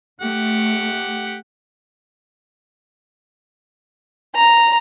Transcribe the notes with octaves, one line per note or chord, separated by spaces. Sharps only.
A3 G4 F#5
A#5